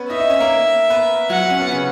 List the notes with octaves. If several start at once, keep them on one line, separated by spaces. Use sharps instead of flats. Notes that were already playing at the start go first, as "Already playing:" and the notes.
Already playing: B3 C#4 B4 C#5
D#4 D#5 E5
D#4 D#5
C#4 C#5
A#3 A#4
B3 B4
F#3 F#4 F#5
C#4
B3
C#3 C#4